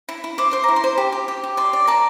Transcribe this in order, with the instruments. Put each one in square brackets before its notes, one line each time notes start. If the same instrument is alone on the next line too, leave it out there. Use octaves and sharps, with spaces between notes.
[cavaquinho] E4
E4
C5 D6
C5 C6
E4 A#5
C6
C5
G4
G4
G4
G4
D5 C6
D5
A#4 A5